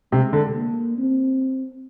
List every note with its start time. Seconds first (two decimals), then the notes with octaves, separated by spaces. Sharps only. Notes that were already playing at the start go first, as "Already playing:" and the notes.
0.12 C3 G#3
0.33 D3
0.55 A#3
0.98 C4